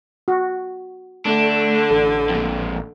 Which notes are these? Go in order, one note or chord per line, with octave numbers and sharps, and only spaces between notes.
F#4
D3 A3 D4
A1 A4
F2 A#2